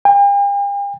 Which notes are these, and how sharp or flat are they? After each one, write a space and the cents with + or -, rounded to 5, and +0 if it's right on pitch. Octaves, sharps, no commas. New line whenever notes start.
G5 +45